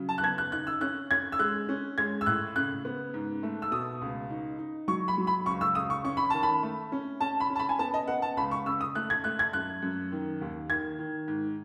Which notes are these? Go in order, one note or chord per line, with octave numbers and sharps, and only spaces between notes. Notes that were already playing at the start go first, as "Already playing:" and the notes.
Already playing: C#3 F#3
A5
F#6
B3 G#6
F#6
D#4 F#6
E6
C#4 F#6
C#4 G#6
E6
G#3 F#6
C#4
G#3 G#6
E6
A2 F#6
C#3 F#6
B3
G#2
A3
E6
B2 D#6
C#2
D#4
D#4
F#3 C#6
B5
F#3
B5
C#2 C#6
E6
C#2 D#6
C#6
C#4 C#6
B5
D#3 A5
B5
A3
C#4
C#4 A5
B5
C#4
A5
B5
G#5
B3 A5
D#5
B3 F#5
A5
C#2 B5
C#6
C#3 E6
D#6
A3 F#6
G#6
A3 F#6
G#6
F#2 F#6
F#2
D#3
D#2
D#3 G#6
D#3
G#2